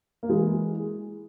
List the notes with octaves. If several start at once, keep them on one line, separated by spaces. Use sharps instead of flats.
A#3
E3 G#3